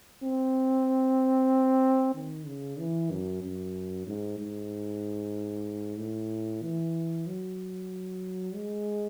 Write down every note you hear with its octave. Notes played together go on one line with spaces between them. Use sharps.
C4
D#3
C#3
E3
F#2
F#2
G#2
G#2
A2
E3
F#3
G#3